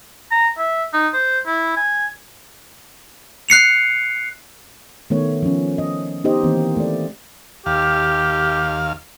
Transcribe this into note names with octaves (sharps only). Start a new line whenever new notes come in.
A#5
E5
D#4
C5
E4
G#5
F#6 C7 C#7 F7
D#3 A3 B3 C#5
F3 C#4
D#5
B3 D#4 G4 C5 D#5
D#3 E3 A#3 C4
A3 D5
D#2 G4 F5